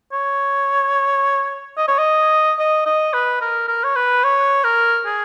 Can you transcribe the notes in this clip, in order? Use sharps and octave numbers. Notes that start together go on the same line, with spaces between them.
C#5
D#5
C#5
D#5
D#5
D#5
B4
A#4
A#4
C#5
B4
C#5
A#4
G#4